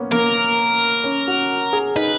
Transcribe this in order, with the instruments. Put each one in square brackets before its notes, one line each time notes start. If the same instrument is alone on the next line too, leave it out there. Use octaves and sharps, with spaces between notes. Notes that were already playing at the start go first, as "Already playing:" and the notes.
Already playing: [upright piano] A#3 B3 C#4
[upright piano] A#3 [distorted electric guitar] A#4
[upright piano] C#4
F#4
G#4
[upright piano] D#4 [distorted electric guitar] B4